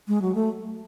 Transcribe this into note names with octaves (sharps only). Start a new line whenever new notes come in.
G#3
F#3
A3